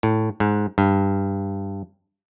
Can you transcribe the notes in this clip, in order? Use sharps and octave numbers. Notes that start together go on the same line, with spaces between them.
A2
G#2
G2